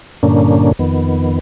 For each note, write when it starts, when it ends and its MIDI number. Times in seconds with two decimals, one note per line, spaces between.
0.23 0.72 43
0.23 0.72 46
0.23 0.72 50
0.23 0.72 58
0.23 0.72 61
0.23 0.72 62
0.79 1.39 41
0.79 1.39 51
0.79 1.39 59